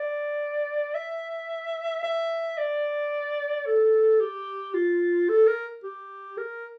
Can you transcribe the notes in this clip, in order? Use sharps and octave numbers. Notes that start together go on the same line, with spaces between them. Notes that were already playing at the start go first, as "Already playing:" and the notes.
Already playing: D5
E5
E5
D5
A4
G4
F4
A4
A#4
G4
A#4